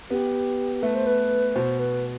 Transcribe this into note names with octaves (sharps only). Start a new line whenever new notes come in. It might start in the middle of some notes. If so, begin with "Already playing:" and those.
B3 G4
A3 B4
C5
B4
B2 C5
B4